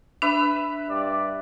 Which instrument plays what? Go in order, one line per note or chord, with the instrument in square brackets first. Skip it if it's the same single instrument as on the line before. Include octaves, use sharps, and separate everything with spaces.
[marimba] D4 [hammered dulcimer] B4 E5
[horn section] G2 D5